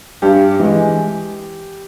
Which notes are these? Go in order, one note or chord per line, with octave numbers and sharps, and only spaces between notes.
G2 G4
E3 G#3